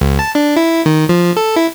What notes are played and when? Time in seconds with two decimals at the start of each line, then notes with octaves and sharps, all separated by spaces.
0.01 C#2
0.19 A5
0.35 D4
0.56 E4
0.86 D#3
1.09 F3
1.37 A4
1.56 E4